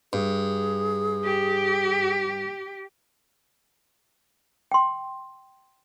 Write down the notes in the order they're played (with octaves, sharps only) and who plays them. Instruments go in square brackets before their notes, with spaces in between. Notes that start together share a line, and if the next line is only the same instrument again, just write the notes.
[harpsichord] G2 [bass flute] G#4
[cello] G4
[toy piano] G5 C6